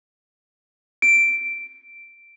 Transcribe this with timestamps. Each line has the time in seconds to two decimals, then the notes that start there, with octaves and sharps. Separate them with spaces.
1.02 D7